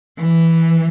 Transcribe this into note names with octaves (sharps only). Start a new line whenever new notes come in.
E3